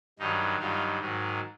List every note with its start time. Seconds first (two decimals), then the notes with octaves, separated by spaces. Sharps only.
0.19 G2 D#3 F#3 D#4
0.59 G2 D#3 F#3 F4
0.99 G#2 D#3 F#3